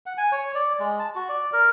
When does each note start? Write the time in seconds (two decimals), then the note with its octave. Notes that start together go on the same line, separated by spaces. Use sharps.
0.06 F#5
0.18 G#5
0.32 C#5
0.55 D5
0.80 G#3
0.99 A5
1.15 F#4
1.29 D5
1.53 A#4